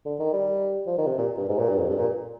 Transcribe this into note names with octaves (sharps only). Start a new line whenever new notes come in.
D3
D#3
G3
F3
D#3
C3
A#2
G2
G#2
A#2
G2
F2
G2
A#2